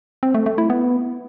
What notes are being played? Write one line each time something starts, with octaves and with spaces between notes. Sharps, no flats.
C4
A3
A3
E4
B3